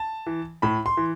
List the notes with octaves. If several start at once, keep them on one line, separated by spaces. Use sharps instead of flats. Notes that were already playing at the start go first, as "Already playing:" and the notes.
Already playing: A5
E3
A2 B5
C6
E3